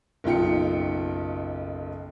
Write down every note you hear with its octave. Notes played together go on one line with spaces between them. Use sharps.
F#1 B1 D#4 F4 G5 C#7